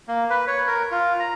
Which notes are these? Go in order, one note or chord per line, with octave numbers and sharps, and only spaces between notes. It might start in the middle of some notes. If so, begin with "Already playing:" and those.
A#3
B4
C#5
A#4
F4
A#5